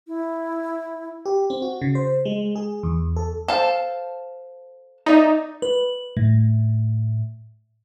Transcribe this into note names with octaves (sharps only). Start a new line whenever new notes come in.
E4
G4
C4
F#4
C#3
C5
G#3
G#4
E2
A4
A4 C5 F5 A5
D#4 D5 E5
B4
A2